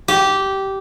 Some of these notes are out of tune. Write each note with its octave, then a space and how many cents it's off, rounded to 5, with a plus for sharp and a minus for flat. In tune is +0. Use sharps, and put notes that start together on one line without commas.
G4 -15